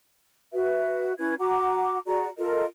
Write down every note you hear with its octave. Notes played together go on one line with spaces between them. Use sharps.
F#4 B4 E5
C#4 E4 B4 G#6
F#4 F#5 A#5 D6
F#4 G#4 D5 A#5
F4 A4 A#4 D#5